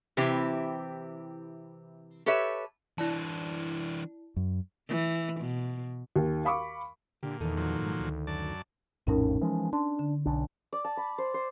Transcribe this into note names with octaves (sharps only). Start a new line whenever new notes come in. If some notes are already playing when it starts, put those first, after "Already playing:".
C3 E3 C4 E4 G4
G4 A4 B4 C#5 E5
E3 D4 E4 D5 A5
F#2
E3
B2
D#2
F5 B5 C#6 D6
A#2 D3 G4
E2 D#3 D#4 A4
A#2 F3 F#3
G#2
D2
F#2 D5 A5
A#1 F2 A2 C#4 D#4 A#4
E3 F3 G#3
D4 C6
D3
B1 D4
D5
A5
B5
C5
C5